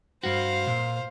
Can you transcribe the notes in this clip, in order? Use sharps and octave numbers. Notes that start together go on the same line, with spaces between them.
G2 F#4 C5 F5
A#2